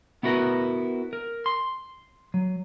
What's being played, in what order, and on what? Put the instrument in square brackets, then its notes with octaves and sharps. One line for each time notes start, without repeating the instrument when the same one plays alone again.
[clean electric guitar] B3 E4 F#4 A#4 B4
A#4
C6
F#3